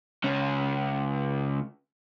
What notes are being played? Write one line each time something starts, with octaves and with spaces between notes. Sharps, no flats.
C#2 C#4